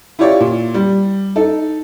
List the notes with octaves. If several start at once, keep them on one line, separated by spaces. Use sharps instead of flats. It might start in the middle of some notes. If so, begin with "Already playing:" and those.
E4 F4 G4 C#5 D5
A#2
G3
D#4 A4